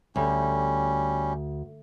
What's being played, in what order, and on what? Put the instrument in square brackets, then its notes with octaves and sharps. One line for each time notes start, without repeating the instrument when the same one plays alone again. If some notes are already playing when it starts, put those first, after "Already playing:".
[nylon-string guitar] D2 [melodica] G3 C#4